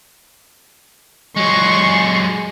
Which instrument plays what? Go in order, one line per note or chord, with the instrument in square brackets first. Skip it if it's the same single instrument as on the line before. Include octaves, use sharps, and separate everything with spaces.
[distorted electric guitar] F#3 G#3 [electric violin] C6 C#6